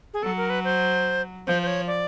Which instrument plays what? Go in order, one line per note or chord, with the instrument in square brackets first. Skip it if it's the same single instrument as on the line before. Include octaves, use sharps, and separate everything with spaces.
[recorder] G#4
[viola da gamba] F#3 [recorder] A4
[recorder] A#4
B4
C5
[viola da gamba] F3 [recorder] C5
[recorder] C5
C#5
D5